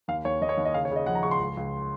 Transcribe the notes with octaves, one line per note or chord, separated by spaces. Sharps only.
D#2 F5
D#2 C#5
D#2 D#5
C#5
D#2
D#5
C#3 F5
C#5
C#3
D#5
F3 F#5
A#5
C#3 C#6
C6
C#2
C#2